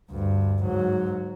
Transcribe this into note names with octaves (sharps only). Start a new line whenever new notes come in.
D2 G2
G#2 F#3